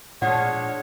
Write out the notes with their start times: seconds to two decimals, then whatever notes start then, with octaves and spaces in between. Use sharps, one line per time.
0.22 A#2 F3 G#3 D4 C#5 F#5